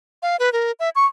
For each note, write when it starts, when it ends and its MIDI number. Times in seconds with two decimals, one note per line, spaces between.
0.22 0.36 77
0.39 0.52 71
0.53 0.72 70
0.80 0.90 76
0.95 1.06 85